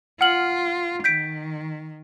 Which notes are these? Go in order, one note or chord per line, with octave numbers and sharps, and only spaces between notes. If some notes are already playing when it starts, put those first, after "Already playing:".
F4 F#5 F6 F#7
D#3 G6 B6 D7